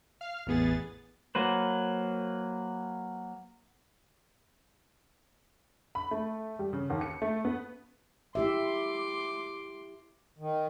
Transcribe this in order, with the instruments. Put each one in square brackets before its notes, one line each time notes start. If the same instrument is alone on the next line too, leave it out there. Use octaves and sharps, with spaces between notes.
[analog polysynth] F5 F6
A1 E2 B3 G#4 A6
[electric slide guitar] F#3 A#3 B4 C5
[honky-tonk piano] B5
A3
G3
C#3
D#2
C#7
A3
B3
[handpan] E4 G4 E5 [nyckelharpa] C6 D6
[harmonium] D#3